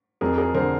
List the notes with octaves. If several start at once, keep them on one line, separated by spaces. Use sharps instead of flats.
F2 G#4 A#4
G#4 A#4
D3 A#4 C5